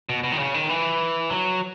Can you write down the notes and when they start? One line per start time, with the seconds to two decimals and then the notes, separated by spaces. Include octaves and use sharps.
0.09 B2
0.24 B2
0.32 D#3
0.39 C#3
0.54 D#3
0.69 E3
1.30 F#3